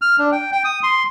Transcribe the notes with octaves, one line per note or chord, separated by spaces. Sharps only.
F6
D4
G5
G5
D#6
C6